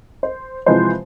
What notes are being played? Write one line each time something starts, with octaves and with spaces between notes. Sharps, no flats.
C5
C3 E3 F3 G#3 B4 C5